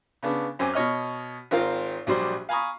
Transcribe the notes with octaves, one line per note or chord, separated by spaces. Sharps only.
C#3 B3 D4
F#2 C4 G#5 D6
B2 C#5 D#5 F6
G#1 C4 F4 A#4 F5
A#1 F#3 G3 C5 D5
F5 G#5 A#5 B5 C#6 D#6